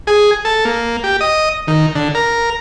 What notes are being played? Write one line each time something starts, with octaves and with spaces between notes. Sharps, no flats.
G#4
A4
A#3
G4
D#5
D#3
D3
A#4